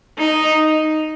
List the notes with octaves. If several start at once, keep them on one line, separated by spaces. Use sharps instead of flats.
D#4